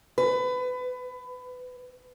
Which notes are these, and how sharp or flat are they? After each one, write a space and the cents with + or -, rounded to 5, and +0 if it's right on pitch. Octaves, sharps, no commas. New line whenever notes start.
B4 +25